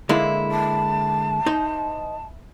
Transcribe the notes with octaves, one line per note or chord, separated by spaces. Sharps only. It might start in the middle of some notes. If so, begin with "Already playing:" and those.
D3 G#3 A#3 E4
A5
D#4 C5